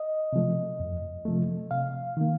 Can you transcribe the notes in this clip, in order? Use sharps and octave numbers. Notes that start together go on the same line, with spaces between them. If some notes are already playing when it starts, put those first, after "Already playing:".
Already playing: D#5
C3 F3 A3
F2
C3 F3 A3
C3 F5
D#3 A#3